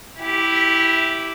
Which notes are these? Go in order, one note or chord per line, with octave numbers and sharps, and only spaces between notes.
E4 G4